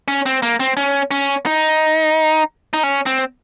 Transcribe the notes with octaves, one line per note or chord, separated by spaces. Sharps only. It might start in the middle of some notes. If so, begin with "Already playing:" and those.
C#4
C4
A#3
C4
C#4
C#4
D#4
D#4
C#4
C4